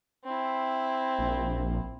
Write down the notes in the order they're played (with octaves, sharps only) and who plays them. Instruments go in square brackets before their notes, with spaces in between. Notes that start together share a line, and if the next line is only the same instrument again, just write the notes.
[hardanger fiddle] C4 E4
[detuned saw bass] A#1